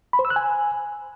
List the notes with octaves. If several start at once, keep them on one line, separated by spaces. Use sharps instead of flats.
B5
C5
E6
F#6
G#5